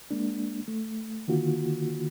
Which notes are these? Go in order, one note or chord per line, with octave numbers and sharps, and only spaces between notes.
G#3 A#3 D4
A3
D3 D#3 A#3 F4 F#4